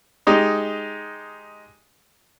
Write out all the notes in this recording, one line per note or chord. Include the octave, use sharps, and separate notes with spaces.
G#3 D#4 G4